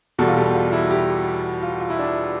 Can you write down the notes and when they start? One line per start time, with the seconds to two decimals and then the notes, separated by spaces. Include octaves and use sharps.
0.18 E2 B2 G3 A4
0.28 F4
0.37 G4
0.54 F4
0.72 E4
0.91 G4
1.62 F4
1.80 F4
1.90 E4
1.99 D4